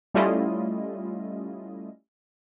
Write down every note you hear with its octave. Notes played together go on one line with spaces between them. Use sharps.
G3 A3 C#4 E4 F4 D#5